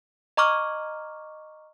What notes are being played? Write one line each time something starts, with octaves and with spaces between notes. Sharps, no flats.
D#5 A#5 C#6 D6 F6